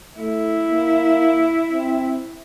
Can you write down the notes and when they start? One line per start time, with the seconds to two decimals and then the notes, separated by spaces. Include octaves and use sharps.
0.18 A3 E4
0.69 A#3
1.73 C4